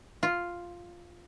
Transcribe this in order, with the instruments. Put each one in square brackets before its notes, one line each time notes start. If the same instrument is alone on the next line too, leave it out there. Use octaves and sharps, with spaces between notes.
[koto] F4